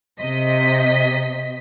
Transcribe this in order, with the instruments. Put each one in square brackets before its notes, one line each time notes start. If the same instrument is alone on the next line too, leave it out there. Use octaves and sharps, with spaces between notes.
[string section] C3 D#5 B6